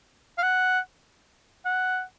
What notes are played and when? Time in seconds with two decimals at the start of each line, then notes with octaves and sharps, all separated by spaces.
0.38 F5
0.42 F#5
1.65 F#5